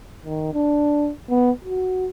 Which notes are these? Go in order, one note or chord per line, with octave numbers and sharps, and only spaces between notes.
D#3
D4
B3
F#4